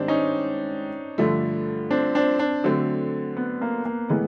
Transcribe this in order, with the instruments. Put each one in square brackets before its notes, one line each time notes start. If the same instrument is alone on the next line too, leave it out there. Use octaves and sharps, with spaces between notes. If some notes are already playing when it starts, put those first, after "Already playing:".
Already playing: [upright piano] G#2 D#3 G3 [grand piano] C4 D4
[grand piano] C#4 D#4
[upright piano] G2 D3 F3 A3
[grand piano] C4 D4
C4 D4
C4 D4
[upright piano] D3 F#3 A3 C4
[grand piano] B3
A#3
A#3
[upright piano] A2 E3 G#3 [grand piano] B3